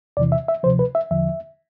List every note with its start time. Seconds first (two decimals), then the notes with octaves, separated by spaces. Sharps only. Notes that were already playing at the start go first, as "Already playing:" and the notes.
0.17 E2 C3 E3 D5
0.32 E5
0.48 E5
0.63 D2 C3 F3 C5
0.79 B4
0.95 E5
1.11 E2 D3 F3 E5